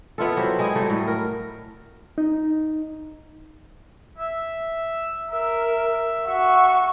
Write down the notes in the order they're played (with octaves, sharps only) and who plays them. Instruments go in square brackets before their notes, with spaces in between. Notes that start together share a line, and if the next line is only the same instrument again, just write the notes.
[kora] B3 E4 F4 A4
F#3 G4 C5 E5
G#3 E4 G#4 D#5
F#3 G3 A3
A2
A#4
[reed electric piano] D#4
[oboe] E5
[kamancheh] A#4 [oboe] E5
[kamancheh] F#4 C#6 [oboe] E5